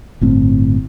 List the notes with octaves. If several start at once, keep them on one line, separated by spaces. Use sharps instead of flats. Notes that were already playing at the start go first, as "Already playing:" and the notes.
G1 A2 C4